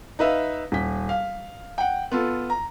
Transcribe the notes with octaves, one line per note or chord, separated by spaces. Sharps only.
D#4 B4 E5 F5
D#1 B6
F5
F#5 G5
B3 F4 A4
A#5